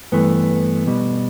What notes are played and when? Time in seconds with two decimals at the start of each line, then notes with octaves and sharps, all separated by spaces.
0.12 G2 E3 A3 B3
0.87 B2 G3